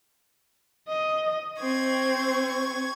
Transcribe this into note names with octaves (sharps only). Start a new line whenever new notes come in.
D#5
C4 C#6 G#6